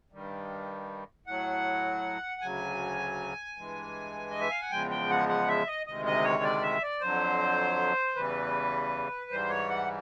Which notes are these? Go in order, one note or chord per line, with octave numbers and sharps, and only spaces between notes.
G2 D#3 G3
A2 F#3 F#5
D2 C#3 F#3 G#5
G2 E3 G#3
D#5
E5
F5
F#5
E2 C#3 F3 G#3 G5
G5
F#5
F#5
E5
D#5
D2 C3 D#3 G#3 D#5
D#5
C#5
D5
E5
D5
F2 D3 F#3 C5
E2 C#3 E3 G3 B4
G#2 E3 G3 C5
C#5
F#5